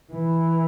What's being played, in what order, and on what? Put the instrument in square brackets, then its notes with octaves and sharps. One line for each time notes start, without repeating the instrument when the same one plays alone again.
[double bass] E3